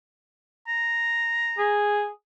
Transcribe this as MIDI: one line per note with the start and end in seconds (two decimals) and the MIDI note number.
0.68 1.80 82
1.58 2.09 68